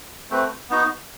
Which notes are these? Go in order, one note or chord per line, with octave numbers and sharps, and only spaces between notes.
A3 C4 F#4 B4
B3 D#4 F#4